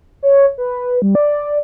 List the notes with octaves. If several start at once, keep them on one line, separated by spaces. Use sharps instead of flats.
C#5
B4
G3
D5